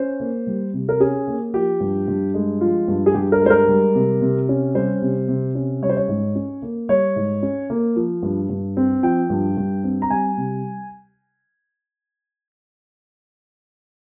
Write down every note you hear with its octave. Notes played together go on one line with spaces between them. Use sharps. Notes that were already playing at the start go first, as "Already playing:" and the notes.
Already playing: C#4 C5
A#3
G3
C3
A#4
C#4 G#4
A#3
F3 G4
G2
G2
G#3
F3 F4
G2
G#4
G2 G4
A#4
G#3 C5
A#4
G3
C3
C3
C#4
G3 C5
C3
C3
C#4
G3 C#5
C5
C#5
G#2
C#4
A#3
G3 C#5
G#2
C#4
A#3
F3
G2
G2
C4
F3 G5
G2
G2
C4
A#5
G3 G#5
C3